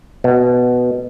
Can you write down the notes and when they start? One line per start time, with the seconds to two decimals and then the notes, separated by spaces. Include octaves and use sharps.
0.24 B2